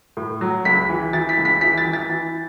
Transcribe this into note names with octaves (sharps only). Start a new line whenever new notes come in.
A2
F#3
C#2 B6
E3
E3 A6
B6
C#2
B6
E3 B6
A6
E3
A6
E3